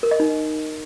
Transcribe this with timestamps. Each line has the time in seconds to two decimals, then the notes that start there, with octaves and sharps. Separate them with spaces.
0.03 A#4
0.11 D#5
0.20 D#4